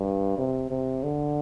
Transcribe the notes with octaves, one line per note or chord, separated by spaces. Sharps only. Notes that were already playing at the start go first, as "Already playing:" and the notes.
Already playing: G2
C3
C3
D3